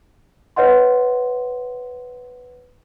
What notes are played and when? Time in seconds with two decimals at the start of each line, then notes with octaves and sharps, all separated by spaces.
0.56 B4 C#5 D#5 F#5 C6